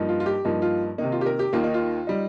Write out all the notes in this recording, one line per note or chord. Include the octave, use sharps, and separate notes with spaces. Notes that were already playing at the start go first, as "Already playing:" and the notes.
Already playing: G2 F3 A#3 D#4
F4
F4
G4
G2 F3 A#3 D#4
F4
C3 D#3 A#3 D#4
F4
G4
A#4
G4
D#2 D#3 A#3 F4
D#4
F4
G3 D#4